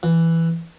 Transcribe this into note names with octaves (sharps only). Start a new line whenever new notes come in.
E3